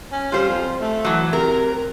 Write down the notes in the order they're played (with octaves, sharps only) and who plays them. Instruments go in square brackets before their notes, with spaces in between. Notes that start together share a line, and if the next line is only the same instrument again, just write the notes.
[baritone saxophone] C#4
[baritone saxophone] G3 [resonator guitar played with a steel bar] F4 C5
[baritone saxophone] F2
A3
[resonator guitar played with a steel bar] E3 F#3
[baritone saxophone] C3 [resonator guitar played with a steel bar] A#4